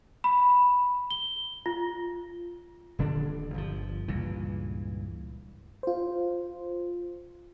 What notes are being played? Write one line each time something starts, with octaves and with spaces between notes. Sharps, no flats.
B5
G7
F4
D#1 D3 D4
G1 C3 F3
C#2 G2 A#2 E3
F4 C5